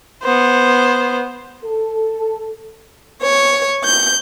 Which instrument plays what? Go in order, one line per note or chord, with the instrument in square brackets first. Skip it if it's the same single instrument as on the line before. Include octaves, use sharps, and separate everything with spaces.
[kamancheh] B3 C5
[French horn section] A4
[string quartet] C#5
G6